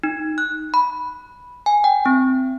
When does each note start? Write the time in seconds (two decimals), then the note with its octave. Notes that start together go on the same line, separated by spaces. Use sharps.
0.03 D#4
0.38 F#6
0.74 B5
1.66 G#5
1.84 G5
2.06 C4